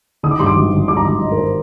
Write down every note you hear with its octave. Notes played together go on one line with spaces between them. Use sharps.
D#3 D#6
D6
G2 C6
D6
G#1
G#1
G2 D6
A#5
G#1 D6
G#1 D#5
A#4
C5